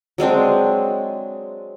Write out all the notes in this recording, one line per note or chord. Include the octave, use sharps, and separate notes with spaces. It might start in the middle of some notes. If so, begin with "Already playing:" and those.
F#3 G#3 C4 D4